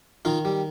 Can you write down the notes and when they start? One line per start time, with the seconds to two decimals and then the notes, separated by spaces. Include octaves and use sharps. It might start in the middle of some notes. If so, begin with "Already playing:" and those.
0.25 D#3 D#4 F4
0.45 G3